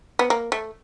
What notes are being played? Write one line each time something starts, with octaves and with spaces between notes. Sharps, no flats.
B3
A#3
A3